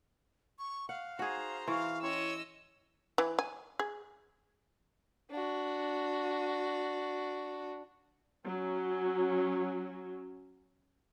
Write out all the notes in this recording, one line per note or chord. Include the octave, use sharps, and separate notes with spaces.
C#6
F5 F#5
D#4 F#4 G#4 C5 A#5
E3 F5 C6 C#6
C#4 E4 C#5 D#5 C6 E6
E3
G#5
G#4
D4 F#4
F#3 C#4